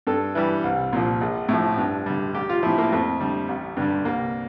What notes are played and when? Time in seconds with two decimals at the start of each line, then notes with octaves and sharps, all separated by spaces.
0.07 G2 A4
0.35 E3 G3
0.64 C2
0.93 A#2 F3
1.21 A#1
1.49 A2 F3
1.78 G2
2.06 D3 G3
2.34 A1 G4
2.49 F4
2.63 A2 F3 E4
2.78 A#3
2.92 F2 A3
3.20 D3 G3
3.48 A1
3.77 G2 D3 G3
4.05 C2 A#3